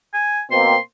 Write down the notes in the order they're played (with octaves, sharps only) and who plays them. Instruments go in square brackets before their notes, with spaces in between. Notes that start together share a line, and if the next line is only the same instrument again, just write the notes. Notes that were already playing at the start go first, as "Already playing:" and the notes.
[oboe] G#5
[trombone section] B2 A#3 C4 [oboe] C6